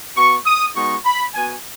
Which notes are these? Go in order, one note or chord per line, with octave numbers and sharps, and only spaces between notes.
B3 F#4 C#6
D#6
G#3 B3 D#4 F#4 C#6
B5
B3 F#4 G#5